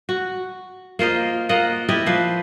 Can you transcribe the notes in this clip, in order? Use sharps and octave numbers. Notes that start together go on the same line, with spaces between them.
F#4
A#3 F4 C5 D#5
A#3 F4 D#5 F#5
E4 G4 D5 D#5
F3 B4 C5